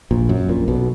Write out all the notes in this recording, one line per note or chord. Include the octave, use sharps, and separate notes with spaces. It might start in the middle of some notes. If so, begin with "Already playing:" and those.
A#1 A#2
F#2
A#1 A#2
B1 B2